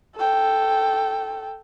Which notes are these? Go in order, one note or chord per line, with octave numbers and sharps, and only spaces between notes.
A4 G5